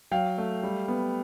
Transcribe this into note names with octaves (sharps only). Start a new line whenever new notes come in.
F#3 F5 G5
A3
G3
B3